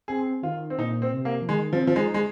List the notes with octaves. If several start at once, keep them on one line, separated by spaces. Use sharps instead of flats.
C4 G#4
D#3 F4
C4
A#2 D#4
C4
C3
A#3
F3
D#3 G#3
F3 C4
F3
G#3 D#4
G#3